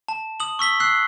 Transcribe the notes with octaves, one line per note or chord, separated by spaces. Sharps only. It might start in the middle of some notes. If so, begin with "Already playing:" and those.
A5
D#6 F#7
C#6 E6 B6 G7
E6 F#6 C7